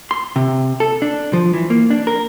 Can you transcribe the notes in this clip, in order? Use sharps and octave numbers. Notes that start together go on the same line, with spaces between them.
C6
C3
A4
D4
F3
E3
A#3
D4
A#4